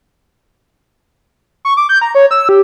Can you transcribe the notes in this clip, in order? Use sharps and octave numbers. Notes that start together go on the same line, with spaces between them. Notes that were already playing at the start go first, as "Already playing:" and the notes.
C#6
D6
G6
A#5
C#5
E6
G4